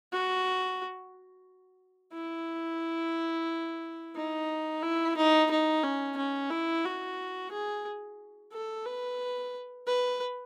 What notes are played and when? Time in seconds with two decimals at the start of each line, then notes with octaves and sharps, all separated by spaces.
0.13 F#4
2.14 E4
4.16 D#4
4.83 E4
5.17 D#4
5.51 D#4
5.83 C#4
6.17 C#4
6.50 E4
6.85 F#4
7.52 G#4
8.53 A4
8.86 B4
9.87 B4